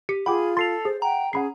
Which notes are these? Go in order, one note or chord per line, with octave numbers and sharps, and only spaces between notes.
G4 C#7
F4 G#4 F#5 G5 B5 D6
A4 C6 A6 C7 F7
G#4 C5
F#5 G5 A#5
C#4 G#4 F#5 B5 C7